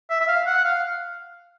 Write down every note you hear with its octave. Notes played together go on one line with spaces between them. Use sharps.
E5
E5
F5
F#5
F5